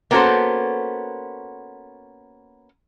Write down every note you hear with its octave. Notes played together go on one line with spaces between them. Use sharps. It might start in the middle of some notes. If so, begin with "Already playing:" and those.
A#3 B3 C#4 F#4 A4 C5